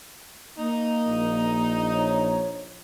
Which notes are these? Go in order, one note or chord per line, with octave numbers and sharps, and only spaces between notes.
A#3 D#4
A#1
C#5